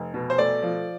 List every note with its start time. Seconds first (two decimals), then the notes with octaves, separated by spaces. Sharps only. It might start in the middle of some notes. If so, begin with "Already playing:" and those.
Already playing: F1
0.14 B2
0.30 C5
0.38 A3 D5
0.62 F3